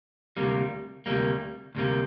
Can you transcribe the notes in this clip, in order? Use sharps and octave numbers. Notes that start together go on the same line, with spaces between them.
D2 C3 G3 A#3
D2 C3 G3 A#3
D2 C3 G3 A#3